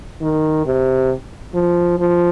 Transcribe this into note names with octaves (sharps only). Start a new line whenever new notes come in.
D#3
C3
F3
F3